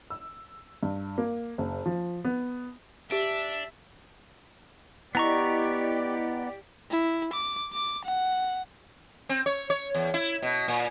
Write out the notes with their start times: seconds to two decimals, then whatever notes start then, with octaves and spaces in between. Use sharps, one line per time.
0.10 E6
0.83 G2
1.18 A#3
1.58 F#1
1.86 F3
2.25 B3
3.11 D4 G4 E5 D7
5.15 B3 E4 G4 D5 D#5 A#5 C#6
6.91 E4
7.33 D6
7.73 D6
8.05 F#5
9.29 C4
9.46 C#5
9.70 C#5
9.95 E2
10.14 E4
10.43 B2
10.68 A#2